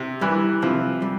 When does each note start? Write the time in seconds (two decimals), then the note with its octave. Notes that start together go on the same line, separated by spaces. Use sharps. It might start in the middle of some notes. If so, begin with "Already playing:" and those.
Already playing: C3
0.21 E3 G3
0.62 C3 F3
1.02 G3